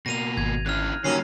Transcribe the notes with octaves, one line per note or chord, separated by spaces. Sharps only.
B2 A#3 A#6 D#7 F7
G#1 G#6
D3 C#4 E4 F6 F#6
D3 D#3 F#3 G3 A#3 C#4 C7